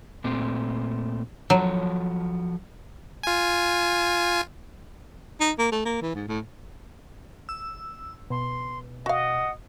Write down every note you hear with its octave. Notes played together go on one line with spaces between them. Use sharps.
A#2 A3 C4
F3 F#3 F#4 A4
F4 G#5
D#4
A#3
A3
A#3
E3
G#2
A2
E6
B2 C6
F#4 D#5 F5 F#5